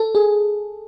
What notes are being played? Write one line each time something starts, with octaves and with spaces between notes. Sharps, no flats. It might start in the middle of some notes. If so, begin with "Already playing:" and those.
Already playing: A4
G#4